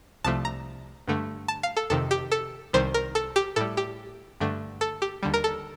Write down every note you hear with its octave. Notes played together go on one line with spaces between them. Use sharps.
C2 C3 F3 A3 A5
A#5
G2 D3 A3
A5
F5
A4
F2 C3 D#3 A4
G4
A4
C2 C3 D#3 G3 C5
A#4
A4
G4
A2 G3 A4
G4
G2 D3 A3
A4
G4
D#2 D3 G3
A#4
A4